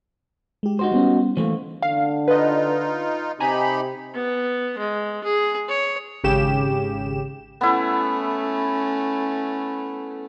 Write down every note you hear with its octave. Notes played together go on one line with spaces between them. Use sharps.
G#3 G4
D#4 F#4 C5
G3 B3 C#4
E3 A3 A#3 C5
D3 F5
D#4 F4 B4 D#5
C3 D#4 G4 G#5 A#5 B5
B3
G#3
G#4
C#5
G#1 C#3 G4 E7
A3 B3 C#4 E4